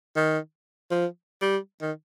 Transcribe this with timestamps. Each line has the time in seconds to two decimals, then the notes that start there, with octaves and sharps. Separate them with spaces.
0.16 D#3
0.91 F3
1.42 G3
1.81 D#3